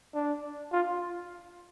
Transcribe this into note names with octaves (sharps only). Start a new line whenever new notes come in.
D4
F4